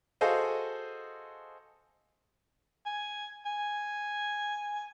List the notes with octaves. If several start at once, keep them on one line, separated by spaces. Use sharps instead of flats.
F#4 G#4 A4 C5 D#5 F5
G#5
G#5